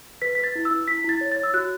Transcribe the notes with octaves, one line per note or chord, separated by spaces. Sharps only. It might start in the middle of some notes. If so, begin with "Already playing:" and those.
B4 B6
B4 B6
A6
E4
E6
E4
E4 B6
E4 A6
C#5
C#5 A6
E6
F#4 F#6